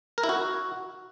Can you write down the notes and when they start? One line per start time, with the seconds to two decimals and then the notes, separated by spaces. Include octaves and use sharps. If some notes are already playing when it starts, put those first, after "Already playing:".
0.18 A#4
0.23 E4
0.29 F#4